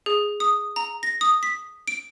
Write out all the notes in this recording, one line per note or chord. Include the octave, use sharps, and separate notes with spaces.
G#4
D#6
A#5
A#6
D#6
B6
D7